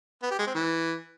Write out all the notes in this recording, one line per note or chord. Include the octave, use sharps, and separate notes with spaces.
B3
G4
G#3
C4
E3